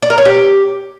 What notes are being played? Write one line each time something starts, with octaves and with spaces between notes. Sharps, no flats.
D5
A#4
C#5
G4